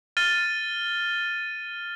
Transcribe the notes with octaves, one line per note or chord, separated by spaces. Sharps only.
F6 A6 D#7 G7